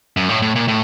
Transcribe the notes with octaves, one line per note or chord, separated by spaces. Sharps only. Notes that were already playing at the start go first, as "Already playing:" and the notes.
F#2
A2
A2
A#2
A2